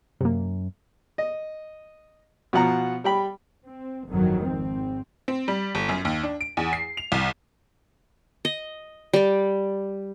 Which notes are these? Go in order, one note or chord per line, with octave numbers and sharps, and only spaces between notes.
F#2 C3 A#3
D#5
B2 F3 F#5 A#5
G3 G5 B5
C4
G1 F2 D#3 F#3
G#1 C4
C4
G3
G1
F#2
D#2
D4
D7
E2
C7
F7
C2
D#5
G3 D5